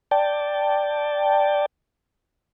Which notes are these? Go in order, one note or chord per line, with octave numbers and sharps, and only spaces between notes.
D5 G5 A5